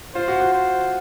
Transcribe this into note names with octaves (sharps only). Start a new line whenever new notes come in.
F4 C5
F#4
F#4
C5